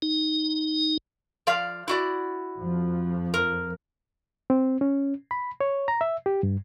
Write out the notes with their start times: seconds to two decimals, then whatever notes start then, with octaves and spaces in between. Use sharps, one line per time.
0.02 D#4
1.47 F3 D5 F5
1.88 E4 F#4 D5
2.61 F2 F3
3.34 A#4
4.50 C4
4.81 C#4
5.31 B5
5.61 C#5
5.88 A#5
6.01 E5
6.26 G4
6.43 G2